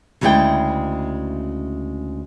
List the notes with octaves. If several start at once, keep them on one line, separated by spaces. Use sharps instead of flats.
D2 C#3 G#3 E4 D5 G5